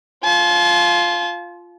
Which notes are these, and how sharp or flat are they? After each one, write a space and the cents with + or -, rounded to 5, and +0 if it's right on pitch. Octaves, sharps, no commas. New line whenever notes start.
F4 +0 A5 -40